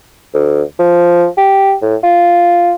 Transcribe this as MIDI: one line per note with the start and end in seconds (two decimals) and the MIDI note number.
0.34 0.62 38
0.79 1.27 53
1.38 1.74 67
1.82 1.96 45
2.04 2.75 65